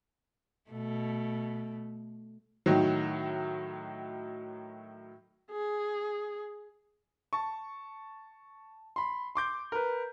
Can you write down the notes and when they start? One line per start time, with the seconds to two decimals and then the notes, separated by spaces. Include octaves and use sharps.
0.71 B2 A3
2.66 A2 D#3 F#3
5.51 G#4
7.33 A5 C#6
8.96 B5 C6
9.35 C6 D6 G6
9.72 A#4 B4